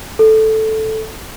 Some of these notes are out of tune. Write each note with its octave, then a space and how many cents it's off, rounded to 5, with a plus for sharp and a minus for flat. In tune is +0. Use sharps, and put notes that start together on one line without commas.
A4 -5